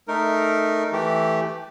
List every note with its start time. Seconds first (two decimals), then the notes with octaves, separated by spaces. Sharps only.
0.08 A3 D#4 A#4
0.92 E3 A3 G4